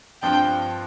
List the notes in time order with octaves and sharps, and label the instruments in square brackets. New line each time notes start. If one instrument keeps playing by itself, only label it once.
[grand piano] G2 F3 C4 F4 [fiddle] G5